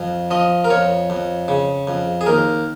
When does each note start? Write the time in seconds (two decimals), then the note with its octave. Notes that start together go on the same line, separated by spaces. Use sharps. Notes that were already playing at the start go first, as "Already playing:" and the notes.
Already playing: F2
0.31 F3 D#5
0.65 A#4
0.70 F2 C#5
1.10 F2
1.48 C#3
1.87 F2
2.21 G#4
2.26 D#2 A#4